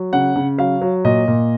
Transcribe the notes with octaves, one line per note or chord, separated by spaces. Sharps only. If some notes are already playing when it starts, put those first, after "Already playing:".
Already playing: F#3
C#3 F#5
C#3
F#3 F5
F#3
A#2 D#5
A#2